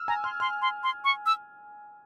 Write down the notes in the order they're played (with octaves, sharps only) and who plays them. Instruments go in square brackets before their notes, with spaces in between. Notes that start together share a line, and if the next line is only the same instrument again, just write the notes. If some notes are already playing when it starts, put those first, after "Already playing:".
Already playing: [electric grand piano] E6 F6
[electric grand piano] G#5 [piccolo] A#5
[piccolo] C6 [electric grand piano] F6
[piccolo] C6 [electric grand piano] F6
[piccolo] C6
C6
C#6
E6